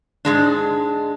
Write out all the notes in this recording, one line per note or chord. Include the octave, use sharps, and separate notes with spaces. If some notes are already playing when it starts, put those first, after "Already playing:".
G#2 G#3 D4